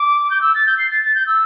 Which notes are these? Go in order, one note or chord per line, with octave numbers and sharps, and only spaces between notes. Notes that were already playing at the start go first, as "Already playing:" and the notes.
Already playing: D6
G6
E6
A6
G6
C7
A6
A6
G6
E6